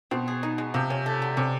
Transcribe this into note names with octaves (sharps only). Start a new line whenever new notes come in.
B2 C4
G#4
D#4
G#3
C3 F3
C#4
A3
D3
C3 C#4